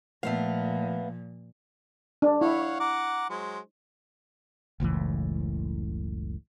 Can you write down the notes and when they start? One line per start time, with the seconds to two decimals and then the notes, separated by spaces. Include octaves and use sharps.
0.23 A#2 F3 A3 B3 F5
2.22 D4
2.41 E4 C#5 F5 F#5
2.80 F#5 A#5 D6
3.30 F#3 G#3 C5
4.80 F#1 C#2 A2 E3